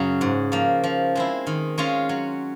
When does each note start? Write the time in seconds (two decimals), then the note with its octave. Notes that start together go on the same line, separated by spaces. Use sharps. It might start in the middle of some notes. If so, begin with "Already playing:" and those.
Already playing: F#2 C#3 F#3
0.21 G#2
0.52 F3 A#3
0.84 F3
1.15 G#3 C4 E4
1.47 D#3
1.78 G#3 C#4 F4
2.09 F#3